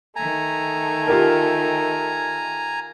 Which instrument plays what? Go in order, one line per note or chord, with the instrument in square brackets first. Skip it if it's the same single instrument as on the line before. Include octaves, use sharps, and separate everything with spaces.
[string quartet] D#3 A3 [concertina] G#5 A#5
[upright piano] F4 G4 A#4